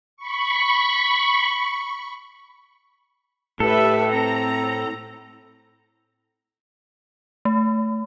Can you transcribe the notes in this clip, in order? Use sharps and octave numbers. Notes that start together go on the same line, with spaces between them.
B5 C#6
A2 G4 A4 B4 E5
C4 A#5
A3